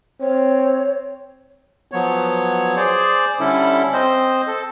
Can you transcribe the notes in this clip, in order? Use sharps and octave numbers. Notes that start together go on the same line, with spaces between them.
C4 C#5
F3 F#3 B3 C#5
G#4 C5 D5
D3 G3 C#4 E4 A4
C4 C5 D#5
A4